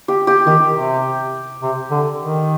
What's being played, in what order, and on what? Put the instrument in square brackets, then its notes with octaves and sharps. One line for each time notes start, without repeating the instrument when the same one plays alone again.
[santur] G4
G4
[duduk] D#3 [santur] G4
[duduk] C3
C3
D3
D#3